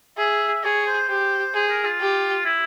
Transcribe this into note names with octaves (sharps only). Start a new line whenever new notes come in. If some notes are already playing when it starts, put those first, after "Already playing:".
G#4 E5
G#4 C#5
C5
G4 C5
G#4 C5
A#4
F4
G4
E4